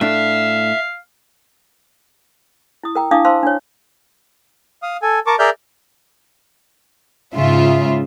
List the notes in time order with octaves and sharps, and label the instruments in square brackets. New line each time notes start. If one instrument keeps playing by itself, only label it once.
[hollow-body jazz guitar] A2 D4 [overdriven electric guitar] E5 [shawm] F5
[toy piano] E4 D#6
A#4 G5 A#5
D4 E4 F5 A5 D6 D#6
C5 F5 A5 C6 E6
D4 C#5
[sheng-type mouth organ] F5 D#6
A4 G#5
A#4 A5 C#6 D6
G#4 A#4 D5 E5 F6 G6
[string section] G#2 C#3 F4 E5